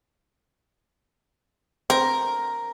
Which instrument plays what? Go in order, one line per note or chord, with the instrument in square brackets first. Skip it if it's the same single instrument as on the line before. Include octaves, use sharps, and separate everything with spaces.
[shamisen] C4 [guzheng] A#4